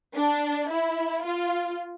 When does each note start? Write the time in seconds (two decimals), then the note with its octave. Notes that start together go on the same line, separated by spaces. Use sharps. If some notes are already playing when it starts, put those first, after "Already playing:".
0.15 D4
0.70 E4
1.24 F4